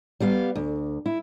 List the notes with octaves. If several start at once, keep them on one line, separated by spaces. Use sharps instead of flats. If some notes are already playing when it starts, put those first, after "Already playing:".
G3 B3 F5
D2
E4